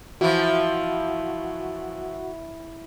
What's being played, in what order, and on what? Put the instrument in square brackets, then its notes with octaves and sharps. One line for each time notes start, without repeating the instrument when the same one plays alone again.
[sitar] E3 F3 [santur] E4 [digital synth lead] F#4